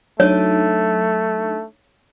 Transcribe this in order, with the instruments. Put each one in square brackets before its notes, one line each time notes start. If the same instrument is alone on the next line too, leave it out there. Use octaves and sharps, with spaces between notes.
[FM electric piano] F#3 D4 D#4 [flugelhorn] A3 [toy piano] C#5